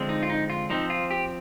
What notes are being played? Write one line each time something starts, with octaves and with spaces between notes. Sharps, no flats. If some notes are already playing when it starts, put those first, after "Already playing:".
Already playing: D3 F3 G#3 C4
D#4
F4
D#4
F4
F3 C4 D#4
F4
G4